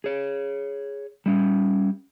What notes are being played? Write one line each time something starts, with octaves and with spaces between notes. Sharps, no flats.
G#4 C#5
G3 C#4